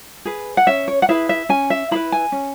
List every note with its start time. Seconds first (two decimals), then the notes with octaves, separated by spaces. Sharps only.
0.25 G#4 B4
0.57 F#5
0.67 C#4 E5
0.88 C#5
1.02 F#5
1.09 E4 G#4 B4 E5
1.29 E5
1.49 C#4 G#5
1.70 E5
1.91 E4 G#4 B4 B5
2.12 G#5
2.32 C#4